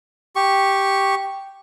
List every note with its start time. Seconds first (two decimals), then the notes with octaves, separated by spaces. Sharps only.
0.36 G4 C#6